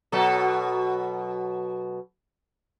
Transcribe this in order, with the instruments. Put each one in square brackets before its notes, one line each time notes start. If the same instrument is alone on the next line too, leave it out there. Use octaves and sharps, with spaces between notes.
[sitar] B2 F#3 A4